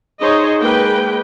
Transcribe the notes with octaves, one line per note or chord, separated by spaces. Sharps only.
D#4 G#4 C5 C#5 D#5
G#3 A#3 B4 G5